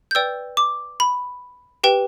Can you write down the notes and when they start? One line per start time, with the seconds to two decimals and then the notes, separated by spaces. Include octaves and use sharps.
0.11 G6
0.15 B4 D5 G5 E6
0.57 D6
1.00 B5
1.84 G4 B4 G5